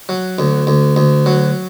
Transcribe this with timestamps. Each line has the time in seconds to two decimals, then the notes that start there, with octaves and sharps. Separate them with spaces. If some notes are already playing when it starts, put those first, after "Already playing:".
0.09 F#3
0.39 D2
0.67 D2
0.96 D2
1.26 F#3